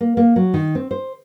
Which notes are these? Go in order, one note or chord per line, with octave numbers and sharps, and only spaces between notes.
A#3
A#3
F#3
D#3
C4
C5